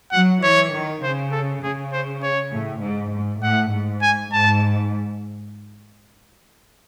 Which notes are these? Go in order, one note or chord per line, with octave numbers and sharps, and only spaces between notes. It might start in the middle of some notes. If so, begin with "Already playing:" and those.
F#3 F#5
E3 C#5
D#3
C#3 C5
A4
C#3 G#4
C5
C#5
A2
G#2
G#2
A2 F#5
G#2
G#5
G#2 A5